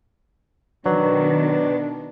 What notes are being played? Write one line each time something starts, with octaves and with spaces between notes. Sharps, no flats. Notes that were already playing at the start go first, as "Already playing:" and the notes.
B2 D#3 F#3 D4 B4